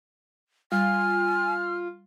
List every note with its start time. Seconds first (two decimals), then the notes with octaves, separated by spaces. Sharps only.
0.72 G3 F4 G#5 F6